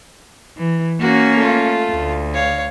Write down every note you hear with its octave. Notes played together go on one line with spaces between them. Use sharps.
E3
A#3 C#4 F#4
A3 F4
D2
C#5 F5